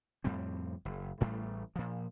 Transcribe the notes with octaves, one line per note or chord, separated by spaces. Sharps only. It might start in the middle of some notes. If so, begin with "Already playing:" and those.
F2 A2 G3 C4
F#1
A1 A2 G3 A3
A#2 F3